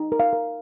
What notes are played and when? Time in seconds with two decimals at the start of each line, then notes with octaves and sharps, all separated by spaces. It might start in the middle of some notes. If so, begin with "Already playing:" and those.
Already playing: D#4
0.12 A#4
0.20 F5
0.33 A#4